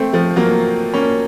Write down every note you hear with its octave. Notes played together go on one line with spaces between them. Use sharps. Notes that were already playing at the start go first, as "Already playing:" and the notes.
Already playing: A3 C4
F3 A3
F#3 A#3
A#3 C#4